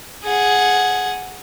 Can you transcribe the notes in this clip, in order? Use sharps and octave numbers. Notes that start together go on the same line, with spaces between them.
G#4 F#5